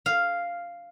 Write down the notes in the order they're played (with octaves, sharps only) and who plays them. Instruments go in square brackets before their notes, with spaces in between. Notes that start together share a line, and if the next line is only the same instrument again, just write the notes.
[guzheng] F5